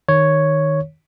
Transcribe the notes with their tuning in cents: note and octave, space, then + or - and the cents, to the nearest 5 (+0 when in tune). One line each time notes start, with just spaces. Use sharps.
D#3 +0 C#5 +0